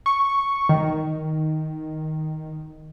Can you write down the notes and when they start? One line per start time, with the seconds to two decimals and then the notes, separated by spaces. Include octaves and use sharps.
0.06 C#6
0.69 D#3